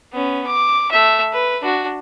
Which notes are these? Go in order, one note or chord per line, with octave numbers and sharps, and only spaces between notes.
B3 C#4
D6
A3 E5
B4
D4 F#4